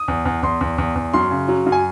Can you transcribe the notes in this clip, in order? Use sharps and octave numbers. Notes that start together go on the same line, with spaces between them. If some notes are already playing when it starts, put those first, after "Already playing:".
Already playing: D#6
E2
E2
E2 C6
E2
E2
E2
F#2 C6
C#3
F#3
F#2
G#5